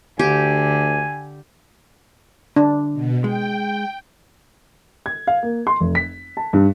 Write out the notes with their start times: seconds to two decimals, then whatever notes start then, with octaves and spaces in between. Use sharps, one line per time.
0.19 D2 D3 G4 G#5
2.56 D3 D4
2.94 B2
3.24 G#3 G5
5.06 G#6
5.27 F5
5.43 A#3
5.67 C6
5.80 F1
5.95 B6
6.37 A5
6.53 G2